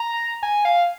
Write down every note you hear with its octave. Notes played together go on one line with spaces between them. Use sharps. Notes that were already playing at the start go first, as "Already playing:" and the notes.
Already playing: A#5
G#5
F5